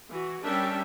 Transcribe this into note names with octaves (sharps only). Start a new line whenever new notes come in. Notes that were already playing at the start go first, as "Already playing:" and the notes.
E3 F#4
G3 C#4 D4 G4 A#4 E5